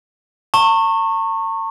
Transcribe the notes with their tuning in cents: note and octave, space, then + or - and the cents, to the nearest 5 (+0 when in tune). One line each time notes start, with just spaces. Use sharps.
A5 +45 C#6 -20